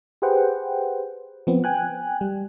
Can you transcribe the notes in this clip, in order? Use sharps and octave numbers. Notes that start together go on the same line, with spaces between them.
G4 G#4 B4 C5 F#5 G5
F3 B3 C4
G5 G#5 F#6
G3